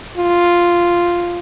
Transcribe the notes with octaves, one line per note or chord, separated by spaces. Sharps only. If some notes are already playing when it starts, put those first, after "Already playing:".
F4